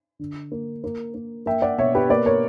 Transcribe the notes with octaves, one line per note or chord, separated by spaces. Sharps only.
D3
A#3
A#3
A#3
A#3 E5 G5
D5 F#5
B2 C#5 E5
G4 B4
A#3 B4 D5
A#4 C#5